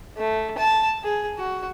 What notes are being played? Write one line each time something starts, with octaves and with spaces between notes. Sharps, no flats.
A3
A5
G#4
F#4